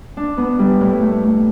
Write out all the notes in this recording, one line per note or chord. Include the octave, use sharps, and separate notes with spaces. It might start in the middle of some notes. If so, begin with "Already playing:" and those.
D4
B3
G3
A2
A3
A3